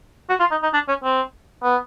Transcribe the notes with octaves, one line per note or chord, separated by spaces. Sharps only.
F#4
F4
D#4
D#4
D4
C#4
C4
B3